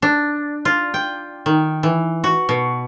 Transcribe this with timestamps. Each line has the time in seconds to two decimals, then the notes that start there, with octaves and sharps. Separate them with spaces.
0.02 D4
0.65 F4
0.94 G5
1.46 D#3
1.83 E3
2.24 F#4
2.49 B2